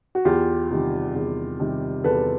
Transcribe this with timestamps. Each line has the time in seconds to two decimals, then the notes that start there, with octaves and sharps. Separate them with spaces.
0.15 F#4
0.25 E2 F4 G4
0.70 C3 D#3 G3
1.15 E2
1.60 C3 D#3 G3
2.04 E2 A4 B4